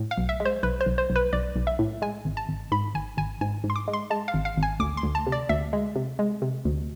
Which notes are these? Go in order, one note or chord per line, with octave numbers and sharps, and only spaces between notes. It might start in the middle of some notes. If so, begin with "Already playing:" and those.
Already playing: A2
F5
B1
E5
G#3
C5
B1 B4
C5
B1
C5
B1
B4
B1 D5
B1
E5
A2
G#3 G#5
G#1
A5
G#1
G#2 B5
G#1 G#5
G#1 G#5
G#2 G#5
G#2
C6
D6
G#3
C6
G#3 A5
F5
G#1
F5
G#1
G#5
D2 D6
C6
D2
A5
C3
D5
D2 E5
G#3
C3
G#3
C3
D2